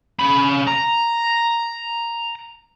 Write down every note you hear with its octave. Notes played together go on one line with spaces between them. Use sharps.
C#3 B5
A#5